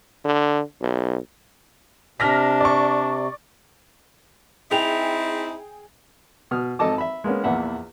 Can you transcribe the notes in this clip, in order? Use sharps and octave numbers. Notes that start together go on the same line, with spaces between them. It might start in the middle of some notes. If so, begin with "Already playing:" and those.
D3
B1
C3 D4 F6 A#6 B6
D5 C#6
C4 D#4 E4 G#4 G5 F7
B2 D#6 F6
G#1 A4 D#5 A5 D6
E5 B5
G#3 A#3 B3 C#4
A#1 E2 B4 E5 F#5